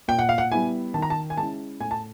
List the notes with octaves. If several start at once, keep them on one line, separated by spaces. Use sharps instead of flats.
A#2 G5
F#5
F5
F#5
G3 B3 E4 G#5
D#3 A5
A#5
A5
G#5
G#3 C#4 E4 A5
A2 G#5
A5